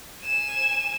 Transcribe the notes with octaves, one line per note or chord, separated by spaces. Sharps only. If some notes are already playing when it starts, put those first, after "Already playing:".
G#5 E7